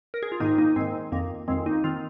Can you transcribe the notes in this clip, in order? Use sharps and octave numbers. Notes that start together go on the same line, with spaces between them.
A#4
G#4
F4
G#2 D#3 A#3 D#4
A#3 D#4
G#2 D#3 G#3 C4
F2 D#3 A#3
F2 D#3 G#3 C4
A#3 D#4
D#3 C4 F4